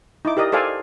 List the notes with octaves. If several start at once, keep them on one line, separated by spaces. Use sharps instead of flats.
D#4 E4 D6
G4 A#4 D5 D#5
A4 C5 D5 F5 G#5